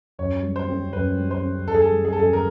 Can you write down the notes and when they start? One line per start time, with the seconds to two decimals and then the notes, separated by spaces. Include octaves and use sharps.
0.19 F#2 C#5
0.43 G3
0.56 C5
0.68 C4
0.93 F#2 B4
1.18 G3
1.31 C5
1.43 C4
1.68 F#2 A4
1.75 G#4
1.82 A4
1.92 G3
2.05 G#4
2.13 A4
2.18 F#2 G#4
2.33 A#4